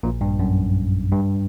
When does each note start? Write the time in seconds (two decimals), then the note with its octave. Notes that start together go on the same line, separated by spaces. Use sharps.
0.03 A#1 A#2
0.21 G2
0.40 F#2
1.12 G2